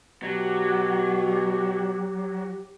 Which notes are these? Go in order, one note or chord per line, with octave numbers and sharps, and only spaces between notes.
B2 F#3 G4